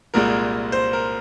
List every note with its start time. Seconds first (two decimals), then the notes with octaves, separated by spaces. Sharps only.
0.14 C2 A#2 G#3 A#4
0.72 C5
0.93 A#4